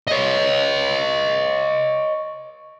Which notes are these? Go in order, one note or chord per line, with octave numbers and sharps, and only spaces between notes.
C#5 D#5